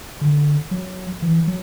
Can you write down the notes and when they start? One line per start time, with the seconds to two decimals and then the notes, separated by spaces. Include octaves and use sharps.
0.21 D3
0.71 F#3
1.22 E3
1.47 F#3